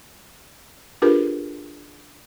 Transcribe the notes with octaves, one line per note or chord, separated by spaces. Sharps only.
D4 F4 G4 G#4 A#4 B4